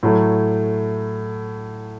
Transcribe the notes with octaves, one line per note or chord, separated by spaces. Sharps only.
A2 F#3 A3